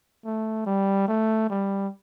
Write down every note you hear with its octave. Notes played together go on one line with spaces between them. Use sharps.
A3
G3
A3
G3